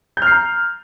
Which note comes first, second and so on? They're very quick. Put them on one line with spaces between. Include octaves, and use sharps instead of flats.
G6 F6 C7 A#5